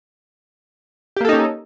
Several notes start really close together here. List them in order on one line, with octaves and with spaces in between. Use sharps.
G4 A#3 A4 D#4 C#4